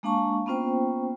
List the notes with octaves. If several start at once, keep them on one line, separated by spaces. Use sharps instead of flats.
G#3 A#3 D4 F5 A5 C#6
A#3 B3 C#4 F4 C5 G5